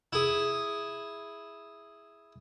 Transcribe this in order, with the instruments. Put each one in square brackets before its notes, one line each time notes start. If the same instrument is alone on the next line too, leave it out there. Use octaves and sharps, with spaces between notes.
[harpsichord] E4 G#4